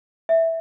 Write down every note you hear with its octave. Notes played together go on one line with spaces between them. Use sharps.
E5